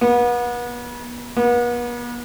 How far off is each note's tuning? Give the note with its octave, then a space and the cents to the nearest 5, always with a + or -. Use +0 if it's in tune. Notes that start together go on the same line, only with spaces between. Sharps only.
B3 -35
B3 -40